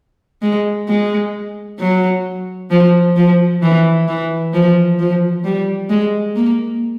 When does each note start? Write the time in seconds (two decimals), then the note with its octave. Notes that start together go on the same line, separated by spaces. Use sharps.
0.42 G#3
0.88 G#3
1.79 F#3
2.70 F3
3.16 F3
3.62 E3
4.08 E3
4.53 F3
4.99 F3
5.44 G3
5.89 G#3
6.36 A#3